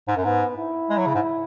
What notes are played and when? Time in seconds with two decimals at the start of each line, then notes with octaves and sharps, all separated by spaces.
0.08 G#2
0.17 F#2
0.24 G#2 B3
0.57 E4
0.90 G#3
0.98 F#3
1.06 C#3
1.15 G#2